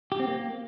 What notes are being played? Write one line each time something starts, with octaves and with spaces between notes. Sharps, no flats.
G4
C4
A#3